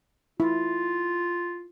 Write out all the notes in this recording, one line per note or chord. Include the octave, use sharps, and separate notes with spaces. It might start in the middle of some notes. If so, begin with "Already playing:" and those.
E4 F4